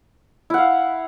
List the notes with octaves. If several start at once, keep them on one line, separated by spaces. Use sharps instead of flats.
E4 F5 F#5